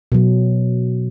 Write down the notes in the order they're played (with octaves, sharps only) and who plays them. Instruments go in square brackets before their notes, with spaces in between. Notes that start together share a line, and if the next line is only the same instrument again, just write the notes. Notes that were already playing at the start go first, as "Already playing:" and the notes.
[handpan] B2 F#3